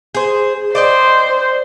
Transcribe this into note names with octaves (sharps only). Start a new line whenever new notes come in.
G#4 C5
C5 D5 D#5 G5